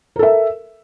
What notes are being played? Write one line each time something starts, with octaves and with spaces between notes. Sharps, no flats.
A4 A#4 E5